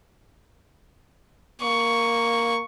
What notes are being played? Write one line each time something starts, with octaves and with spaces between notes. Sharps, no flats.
A#3 C#6